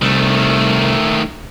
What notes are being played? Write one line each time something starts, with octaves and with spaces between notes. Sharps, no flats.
C2 D#3 A3